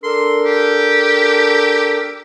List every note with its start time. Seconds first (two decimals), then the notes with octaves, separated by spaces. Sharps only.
0.03 D4 A4 A#4 C6
0.45 G4